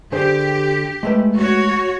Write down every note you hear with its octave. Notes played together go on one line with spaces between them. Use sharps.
D3 G4 G#4 C5
G#3 A3 B4
F#4 C#5